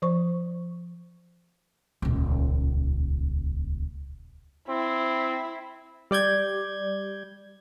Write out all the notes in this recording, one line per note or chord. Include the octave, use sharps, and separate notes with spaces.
F3 C5 C#6
D#1 C#2
C4 E4
G3 D5 G6 G#6